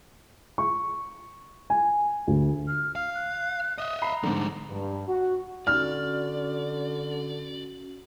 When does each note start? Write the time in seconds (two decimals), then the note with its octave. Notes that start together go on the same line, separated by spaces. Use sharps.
0.58 C#6
1.70 G#5
2.27 D2
2.67 F6
2.95 F5 F6
3.14 F#6
3.78 D#5 E5 D#6
4.02 A#5 B5 C7
4.23 G#2 D3 F3 G3
4.71 G2
5.08 F#4
5.67 D3 C#4 F#4 D5 F6